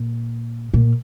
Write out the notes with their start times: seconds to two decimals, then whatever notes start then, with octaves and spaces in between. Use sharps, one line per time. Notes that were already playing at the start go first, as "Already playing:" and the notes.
Already playing: A#2
0.74 A#2